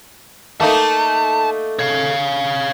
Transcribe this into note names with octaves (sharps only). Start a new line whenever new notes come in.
A3 A#3 D#4 A5
C#5 F5